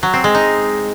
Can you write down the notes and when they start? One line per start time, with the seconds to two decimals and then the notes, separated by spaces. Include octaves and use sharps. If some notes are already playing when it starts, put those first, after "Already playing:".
0.03 F#3
0.13 C4
0.24 G#3
0.35 D#4